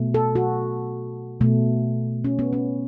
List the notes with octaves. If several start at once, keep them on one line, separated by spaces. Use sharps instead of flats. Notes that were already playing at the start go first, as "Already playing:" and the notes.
Already playing: B2 A3
A4
F#4
B2 A3
C#4
B3
C#4